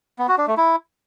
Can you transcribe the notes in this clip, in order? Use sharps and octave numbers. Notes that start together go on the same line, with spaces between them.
B3
F#4
D4
A3
E4